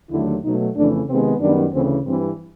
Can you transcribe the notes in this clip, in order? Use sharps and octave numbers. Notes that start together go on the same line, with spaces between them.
D#2 D3 F#3 A3 E4
B2 F#3 A3 D#4
F2 C#3 E3 A3 D4
C3 D#3 G#3 B3 C4
F#2 D#3 G3 B3 D4
D2 C#3 E3 C4
G2 E3 G3 C4